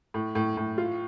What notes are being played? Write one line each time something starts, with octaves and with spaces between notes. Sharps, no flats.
A2
A2
A2
F4